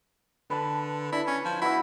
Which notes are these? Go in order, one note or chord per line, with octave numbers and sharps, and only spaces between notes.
D3 B4 A5
D4 E4
C#4
F3
E4 F#4 B4 E5